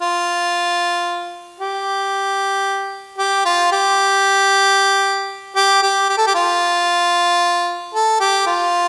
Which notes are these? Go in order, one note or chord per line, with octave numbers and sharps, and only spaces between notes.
F4
G4
G4
F4
G4
G4
G4
G4
A4
G4
F4
A4
G4
F4